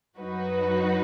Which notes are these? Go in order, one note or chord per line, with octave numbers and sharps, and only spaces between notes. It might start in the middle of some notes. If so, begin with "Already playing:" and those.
F#2 F#3 D#4 F#4 B4